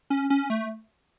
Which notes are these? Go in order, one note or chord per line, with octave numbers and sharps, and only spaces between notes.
C#4
C#4
A3